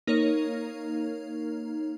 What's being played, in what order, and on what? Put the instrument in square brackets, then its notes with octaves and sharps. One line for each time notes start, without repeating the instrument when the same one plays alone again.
[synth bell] A#3 D#4 A#4 C#5